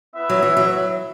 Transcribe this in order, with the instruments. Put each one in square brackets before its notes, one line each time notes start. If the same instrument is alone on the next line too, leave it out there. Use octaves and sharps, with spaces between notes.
[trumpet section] B3 E4 B4 E5
[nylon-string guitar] F#3
E3
F#3